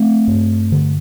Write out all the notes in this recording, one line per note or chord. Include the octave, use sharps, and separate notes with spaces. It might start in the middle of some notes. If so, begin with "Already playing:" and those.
Already playing: A3 C4
G2
D3